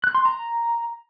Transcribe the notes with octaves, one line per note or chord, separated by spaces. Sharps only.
F#6
C6
A#5